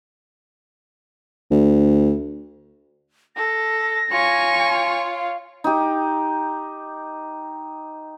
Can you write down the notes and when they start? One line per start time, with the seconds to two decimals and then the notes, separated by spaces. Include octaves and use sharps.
1.51 D2
3.36 A4 A#6
4.12 F4 C#5 G#5 C#6
5.04 F5
5.64 D#4 G4